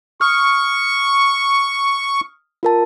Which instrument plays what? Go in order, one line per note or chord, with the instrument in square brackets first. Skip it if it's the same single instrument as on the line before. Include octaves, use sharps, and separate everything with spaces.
[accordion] C#6 [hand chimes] D#6 F6
[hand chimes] F4 A#4 A5